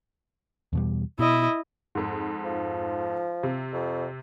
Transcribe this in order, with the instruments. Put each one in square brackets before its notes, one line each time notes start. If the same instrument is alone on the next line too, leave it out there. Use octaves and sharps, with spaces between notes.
[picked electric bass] E2 B2 G3
[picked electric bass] B2 [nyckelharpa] E4 D#5
[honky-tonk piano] F2 G#2
[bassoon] F3
[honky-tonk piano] C3
[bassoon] F2